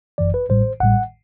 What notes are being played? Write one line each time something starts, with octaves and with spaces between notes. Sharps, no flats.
G1 F#2 E3 D5
B4
A1 A2 G3 C5
A1 A2 G3 F#5